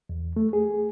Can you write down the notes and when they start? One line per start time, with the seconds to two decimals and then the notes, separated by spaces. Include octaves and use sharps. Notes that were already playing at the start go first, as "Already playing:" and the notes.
0.09 E2
0.36 A3
0.53 G#4